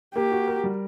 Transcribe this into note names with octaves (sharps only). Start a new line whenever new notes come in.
A#3 G4
F#4
A#4
G3